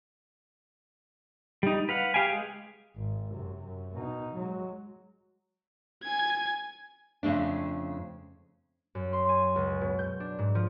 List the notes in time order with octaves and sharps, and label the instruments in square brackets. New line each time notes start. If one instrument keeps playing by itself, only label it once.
[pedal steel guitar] G3 D#4
B4 F5 F#5
G4 F5 G5 G#5
G#3
[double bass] G#1
F#2 C3
F#2
B2 D#4
F#3 G#3
[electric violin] G#5 G#6
[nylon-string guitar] F2 C#3 A3 D4
[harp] F#2
C6
G#5
C#2
B2
G6
D4
G#2
F3